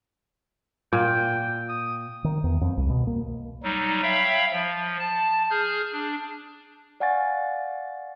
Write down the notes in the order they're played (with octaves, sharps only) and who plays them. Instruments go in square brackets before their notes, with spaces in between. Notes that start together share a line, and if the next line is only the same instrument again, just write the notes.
[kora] A#2 [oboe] G5
[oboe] D#6
[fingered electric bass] D#3
E2
F2
C2
B2
A#3
[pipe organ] F#3 G3 D#4
C#5 E5 F5 G5 B5
F3
A5
G#4 F6 G6
D4
[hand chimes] D5 F5 F#5 G#5 C#6 A6